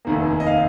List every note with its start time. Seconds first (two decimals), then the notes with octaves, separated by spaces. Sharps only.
0.05 F1 D#2 D#3 A#3
0.40 D#5
0.47 F5